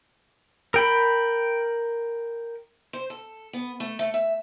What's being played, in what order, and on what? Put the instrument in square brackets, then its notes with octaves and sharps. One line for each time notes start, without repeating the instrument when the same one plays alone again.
[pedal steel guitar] A#4 G5 B5
[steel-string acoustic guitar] C5
A4
B3
A3
A3
E5